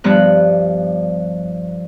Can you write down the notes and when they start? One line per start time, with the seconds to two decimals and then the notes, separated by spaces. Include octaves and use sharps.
0.04 G2 F3 B3 F#6